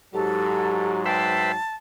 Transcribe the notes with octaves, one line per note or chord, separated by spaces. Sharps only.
G#2 F#3 G4 A4
B4 C5 E5 G5 A5